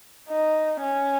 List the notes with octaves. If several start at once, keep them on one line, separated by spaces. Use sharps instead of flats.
D#4
C#4